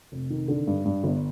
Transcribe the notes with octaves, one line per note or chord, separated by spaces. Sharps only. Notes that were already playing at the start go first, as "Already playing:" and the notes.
F1
D#3
D3
G2
G2
G1